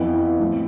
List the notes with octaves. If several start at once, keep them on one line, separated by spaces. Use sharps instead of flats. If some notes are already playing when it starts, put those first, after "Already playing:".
Already playing: F2 E3 B3 E4
E4
A2 F3 C4